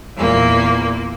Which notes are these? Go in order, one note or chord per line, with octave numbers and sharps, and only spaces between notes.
E2 A#2 A#3